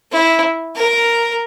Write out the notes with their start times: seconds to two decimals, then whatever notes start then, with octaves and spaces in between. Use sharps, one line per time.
0.12 E4
0.76 A#4